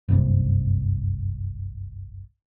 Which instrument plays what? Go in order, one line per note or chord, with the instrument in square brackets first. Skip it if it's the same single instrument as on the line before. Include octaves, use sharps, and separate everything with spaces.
[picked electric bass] F#1 C2 G2 C3